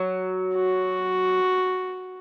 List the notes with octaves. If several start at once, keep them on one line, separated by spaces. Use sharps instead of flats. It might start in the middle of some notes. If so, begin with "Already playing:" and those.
Already playing: F#3
F#4